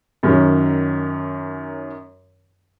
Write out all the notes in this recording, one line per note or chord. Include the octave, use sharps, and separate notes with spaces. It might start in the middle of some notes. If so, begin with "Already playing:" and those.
F#2 D#3 C#4